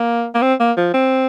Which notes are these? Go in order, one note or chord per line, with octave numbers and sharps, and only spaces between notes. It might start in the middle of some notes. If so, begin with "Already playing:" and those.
Already playing: A#3
A#3
C4
A#3
F3
C4